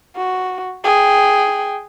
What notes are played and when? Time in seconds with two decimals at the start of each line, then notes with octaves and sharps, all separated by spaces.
0.16 F#4
0.84 G#4 G5